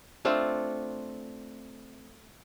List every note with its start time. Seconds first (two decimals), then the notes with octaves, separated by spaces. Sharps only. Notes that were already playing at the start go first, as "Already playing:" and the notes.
0.25 A3 C4 D4 F4